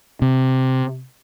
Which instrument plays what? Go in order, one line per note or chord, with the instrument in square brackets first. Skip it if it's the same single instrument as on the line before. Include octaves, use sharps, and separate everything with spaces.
[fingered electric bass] C3